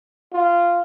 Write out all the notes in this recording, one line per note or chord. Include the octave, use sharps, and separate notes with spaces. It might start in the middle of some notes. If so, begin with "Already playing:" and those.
F4